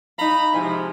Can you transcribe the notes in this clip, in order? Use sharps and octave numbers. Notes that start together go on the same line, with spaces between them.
D#4 F5 A#5 B5
G#2 C3 F3 E4 G#5